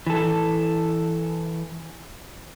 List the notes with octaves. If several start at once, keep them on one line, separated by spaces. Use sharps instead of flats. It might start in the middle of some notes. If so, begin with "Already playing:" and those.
E3 A4